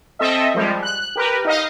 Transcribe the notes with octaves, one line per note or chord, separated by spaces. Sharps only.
C4 A4 D#5 E5
F3 G3 G#3
F#6
F#6
G4 A#4 B4
D#4 D#5 F5